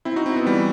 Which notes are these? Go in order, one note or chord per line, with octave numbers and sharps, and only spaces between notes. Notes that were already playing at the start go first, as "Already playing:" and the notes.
C4 E4
D#4 F#4
C4 E4
B3 D#4
E3 G3